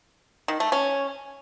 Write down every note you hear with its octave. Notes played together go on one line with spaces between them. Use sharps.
D#3
A3
C#4